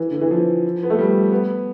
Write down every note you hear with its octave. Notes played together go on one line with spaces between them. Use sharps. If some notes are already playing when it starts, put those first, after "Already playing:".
Already playing: E3
D3
E3
F3
B3
A3
G3
B3